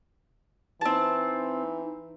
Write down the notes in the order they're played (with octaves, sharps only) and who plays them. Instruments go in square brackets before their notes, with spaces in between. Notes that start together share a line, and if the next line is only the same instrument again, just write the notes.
[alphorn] E3 [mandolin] C4 A5 [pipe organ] D#4